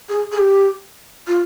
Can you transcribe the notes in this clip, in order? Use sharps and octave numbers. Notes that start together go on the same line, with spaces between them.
G#4
G#4
G4
F4